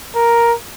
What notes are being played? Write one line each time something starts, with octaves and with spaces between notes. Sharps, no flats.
A#4